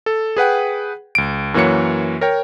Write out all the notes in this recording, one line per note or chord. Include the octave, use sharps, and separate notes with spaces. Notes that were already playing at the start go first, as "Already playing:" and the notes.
A4
G#4 B4 F#5 G5
C#2 D7
F#2 E3 A#3 F#4 C#5 C#7
A#4 C#5 G5